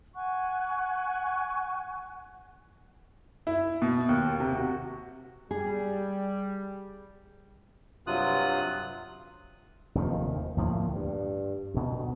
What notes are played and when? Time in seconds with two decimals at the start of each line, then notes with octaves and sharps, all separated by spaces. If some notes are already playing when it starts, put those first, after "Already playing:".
0.15 F#5 G#5 C#6 F#6
3.47 E4
3.82 B2
4.09 D#2
4.40 C3
4.55 F#4
5.51 G3 G#4
8.07 G2 C3 F#3 F4 D#6 F#6
9.95 F1 D#2 D#3 F3
10.57 D2 A2 F3 A#3
10.94 G2
11.74 D2 B2